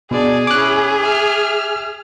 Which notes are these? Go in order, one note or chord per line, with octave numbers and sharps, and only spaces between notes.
B2 D4 G#4 D5
C#4 E4 D6 F#6
E5 F6